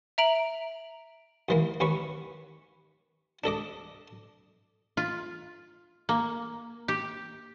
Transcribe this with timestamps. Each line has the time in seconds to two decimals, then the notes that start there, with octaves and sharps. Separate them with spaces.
0.18 E5 A#5 D7 F#7
1.49 D#2 E3 A#3
1.80 D#2 C#4 B4 C#6
3.44 D4 A4 D#5 D6
4.97 F4
6.09 A#3
6.88 G4